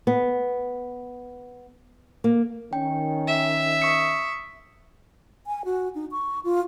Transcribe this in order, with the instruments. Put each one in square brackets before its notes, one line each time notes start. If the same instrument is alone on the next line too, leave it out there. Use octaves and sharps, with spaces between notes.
[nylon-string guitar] B3
A#3
[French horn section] D#3 C#4 [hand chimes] G5
[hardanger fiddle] E5
[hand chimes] C#6 D#6 C#7
[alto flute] G#5
F#4
D#4
C#6
F4